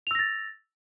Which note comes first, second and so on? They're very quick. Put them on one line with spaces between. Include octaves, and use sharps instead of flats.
F7 E6 A#6 A6